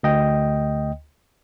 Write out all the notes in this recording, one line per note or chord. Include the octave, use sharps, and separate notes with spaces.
D2 D#5 G5